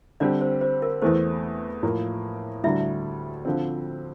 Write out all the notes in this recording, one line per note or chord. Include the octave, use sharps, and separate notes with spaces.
D3 G3 C4 D4 G4 D5
C5
C5
A#4
E2 E3 A3 C5
A2 F3 A#3
D2 D3 G3 E4 E5
D3 F3 C4